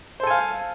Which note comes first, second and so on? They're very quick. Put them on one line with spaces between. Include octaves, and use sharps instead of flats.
C5 A4 G#5 F5